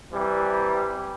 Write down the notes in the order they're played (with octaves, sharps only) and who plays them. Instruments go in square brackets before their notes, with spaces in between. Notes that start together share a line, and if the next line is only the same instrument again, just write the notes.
[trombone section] C3 E3 G3